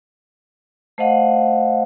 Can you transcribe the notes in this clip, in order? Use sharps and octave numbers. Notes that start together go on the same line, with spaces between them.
A3 C5 D#5 F5 F#5